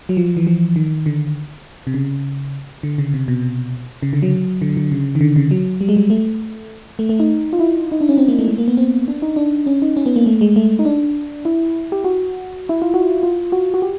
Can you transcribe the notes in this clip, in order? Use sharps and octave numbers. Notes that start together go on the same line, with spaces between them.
F#3
F3
E3
F3
D#3
D3
C3
C#3
D3
C#3
C3
B2
C#3
D3
F#3
D3
D3
C#3
D#3
D3
C#3
F#3
G3
G#3
G3
A3
A3
A3
D#4
F4
E4
D#4
D4
C#4
C4
A#3
A3
G#3
A#3
B3
C4
D4
D#4
D4
C#4
D#4
C#4
B3
A#3
A3
G#3
A3
D#4
D4
E4
G4
F#4
E4
F4
F#4
F4
F#4
F#4
G4